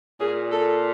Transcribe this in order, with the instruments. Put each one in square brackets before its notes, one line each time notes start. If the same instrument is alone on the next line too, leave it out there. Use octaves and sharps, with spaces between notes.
[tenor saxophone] A#2 [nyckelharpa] G#4
[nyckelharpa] A4